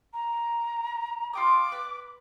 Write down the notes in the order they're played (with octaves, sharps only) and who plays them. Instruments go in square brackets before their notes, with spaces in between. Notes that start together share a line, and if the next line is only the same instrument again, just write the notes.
[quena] A#5
[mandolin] F4 G5 D#6 [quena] D6
[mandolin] B4